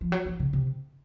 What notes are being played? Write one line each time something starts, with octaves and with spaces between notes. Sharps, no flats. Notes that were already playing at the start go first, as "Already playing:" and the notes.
F3
F#3
F3
C#3
C3